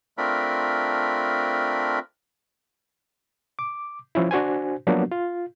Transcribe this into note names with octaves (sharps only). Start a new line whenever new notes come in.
A3 C4 D4 F4 A#4 B5
D6
F3 C#4 E4
D4 F#4 C5 G#5
F3 F#3 A#3 B3 D4 F#4
F4